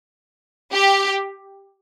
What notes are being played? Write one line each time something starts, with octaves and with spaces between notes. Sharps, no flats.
G4